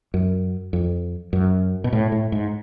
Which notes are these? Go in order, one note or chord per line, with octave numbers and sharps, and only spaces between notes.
F#2
F2
F#2
B2
A2
A2
G#2